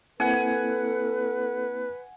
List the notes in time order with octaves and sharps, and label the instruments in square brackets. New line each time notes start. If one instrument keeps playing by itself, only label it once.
[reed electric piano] A#3 C4 E4 [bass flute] A4 [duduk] B4 [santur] F#5 G#5